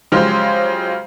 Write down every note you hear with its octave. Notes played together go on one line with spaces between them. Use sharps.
C#3 F3 F#3 G#3 G4 C5